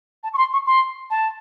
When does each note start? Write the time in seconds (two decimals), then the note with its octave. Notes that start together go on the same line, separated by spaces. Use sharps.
0.24 A5
0.34 C#6
0.38 C6
0.53 C#6
0.67 C6
1.10 A5